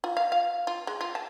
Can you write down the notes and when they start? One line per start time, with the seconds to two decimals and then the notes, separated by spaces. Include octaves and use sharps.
0.04 F4
0.17 F5
0.32 F5
0.67 F4
0.87 G#3
1.01 F4
1.15 A5